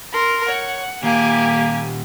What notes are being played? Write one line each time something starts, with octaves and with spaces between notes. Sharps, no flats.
A#4 C6
C#5 F#5
A#2 D#3 A#3 G4 F5 G#5